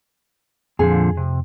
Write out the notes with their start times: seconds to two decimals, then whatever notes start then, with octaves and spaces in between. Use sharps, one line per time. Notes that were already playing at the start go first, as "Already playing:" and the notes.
0.79 F2 A#2 D3 F3 G#4
1.17 C3